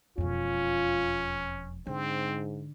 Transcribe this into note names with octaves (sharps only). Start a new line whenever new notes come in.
E1 F2 C#4 F4
G#2 D3 C4